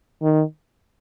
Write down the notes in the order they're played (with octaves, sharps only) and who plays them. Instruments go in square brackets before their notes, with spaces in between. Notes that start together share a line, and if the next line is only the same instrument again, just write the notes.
[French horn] D#3